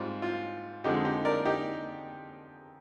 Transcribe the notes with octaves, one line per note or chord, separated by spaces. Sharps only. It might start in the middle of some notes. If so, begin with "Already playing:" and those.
Already playing: G#2 G3 C4 F4
F4
F2 D3 F3 G#3 D#4 G4
D#4 G4
A#4 D5
D#4 G4